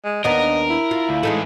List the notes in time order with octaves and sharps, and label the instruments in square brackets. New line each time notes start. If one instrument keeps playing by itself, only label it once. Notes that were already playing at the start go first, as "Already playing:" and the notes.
[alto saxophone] G#3
[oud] D#2 B3 D4 [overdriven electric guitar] A#4 [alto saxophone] D#5
[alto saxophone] E4
[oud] F4
[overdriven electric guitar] D2
[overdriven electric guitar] A2 E3 [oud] G#3 D#4 A4